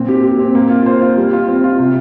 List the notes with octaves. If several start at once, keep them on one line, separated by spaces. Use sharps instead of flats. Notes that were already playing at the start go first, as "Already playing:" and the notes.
Already playing: A#2 C4
G4
G4
C4
A#3
F4
C5
F4
G3
F4
C4
F4
C3